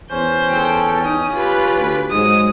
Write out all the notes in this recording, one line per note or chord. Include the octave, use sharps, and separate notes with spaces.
E2 C#4 C5 G6
A4 G5
D#4 D#6
F4 G4 B4 B5
D2
G#2 F#3 G#3 D#6